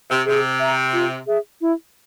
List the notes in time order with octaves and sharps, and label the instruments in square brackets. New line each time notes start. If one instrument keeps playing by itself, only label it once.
[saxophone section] C3
[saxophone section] C3 [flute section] G#4
[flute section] E5 A#5
F4
G#4 E5
E4